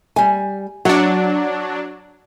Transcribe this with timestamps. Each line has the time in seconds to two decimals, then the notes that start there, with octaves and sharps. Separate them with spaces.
0.16 G3 G#5
0.85 F#3 D4 F#5